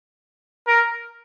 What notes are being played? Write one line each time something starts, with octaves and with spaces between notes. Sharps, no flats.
A#4